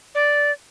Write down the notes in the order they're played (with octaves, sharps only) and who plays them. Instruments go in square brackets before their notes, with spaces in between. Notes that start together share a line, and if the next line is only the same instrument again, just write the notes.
[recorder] D5